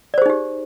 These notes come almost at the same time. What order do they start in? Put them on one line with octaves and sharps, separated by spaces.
D5 C5 G#4 D#4 G4